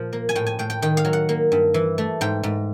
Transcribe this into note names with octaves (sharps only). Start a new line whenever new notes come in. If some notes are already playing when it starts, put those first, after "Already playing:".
Already playing: A#2 F3
A#3
G#5
A2 G5
G#5
A2 G5
G5
D#3 G5
F5
F#3
F#5
A#3
G2
E3
A3
G#2 G5
G#2